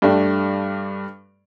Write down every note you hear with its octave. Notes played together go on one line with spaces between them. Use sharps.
G2 G3 A3 D4